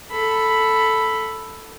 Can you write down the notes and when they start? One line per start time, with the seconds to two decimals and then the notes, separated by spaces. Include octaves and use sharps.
0.11 A4 B5